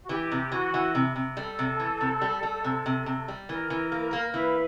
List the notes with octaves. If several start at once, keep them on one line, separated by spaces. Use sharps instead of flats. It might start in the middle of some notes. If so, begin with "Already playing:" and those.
F#4
E3 G4
C3
E3 F#4
E3
C3
C3
G3 A4
C3
E3
C3
G3
G3
C3
C3
C3
G3
E3 A#4
E3
A#3
A#3
E3 B4